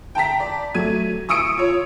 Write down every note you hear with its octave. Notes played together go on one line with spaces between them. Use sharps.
G5 A5 A#5 B6
D5
F#3 A3 G#6 D#7
C#6 D#6 E6 C#7 D7
F4 C#5